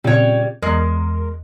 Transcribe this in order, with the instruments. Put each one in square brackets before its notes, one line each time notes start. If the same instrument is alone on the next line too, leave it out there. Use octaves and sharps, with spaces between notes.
[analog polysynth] A#2 C#3 C4 [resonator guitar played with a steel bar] G3 C#5
[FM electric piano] E2 [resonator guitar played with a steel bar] G#3 [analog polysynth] A#4